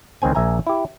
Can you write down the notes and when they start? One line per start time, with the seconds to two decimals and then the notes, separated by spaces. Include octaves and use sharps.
0.22 C#2 D#3 C4 G#5
0.35 A#1 E5 G#5 A#5
0.67 E4 G4